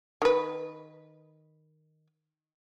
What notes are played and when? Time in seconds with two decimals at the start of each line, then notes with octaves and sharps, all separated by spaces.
0.22 D#3 B4